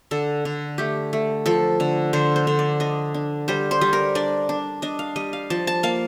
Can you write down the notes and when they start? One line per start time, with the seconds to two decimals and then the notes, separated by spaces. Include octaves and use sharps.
0.11 D3 A4
0.45 D3
0.78 A3 G4
1.13 A3
1.46 F3 A4
1.80 D3
2.13 D3 C5
2.36 C5
2.47 D3
2.59 D5
2.80 D4 D#5
3.14 D4
3.48 G3 C5
3.71 C5
3.81 G3
3.93 A#4
4.15 D4 D5
4.49 D4
4.82 D4 D#5
4.99 F5
5.16 G3 D#5
5.33 F5
5.50 F3 A5
5.67 A5
5.83 A#3 F5